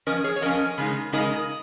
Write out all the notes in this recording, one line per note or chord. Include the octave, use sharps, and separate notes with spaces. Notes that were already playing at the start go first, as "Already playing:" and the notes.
F3 C#4 A#4 D#5
G#4 C#5
C#5
F3 C#4 A#4 D#5
C#3 G#3 D#4
C#3 G#3 D#4 A#4 D#5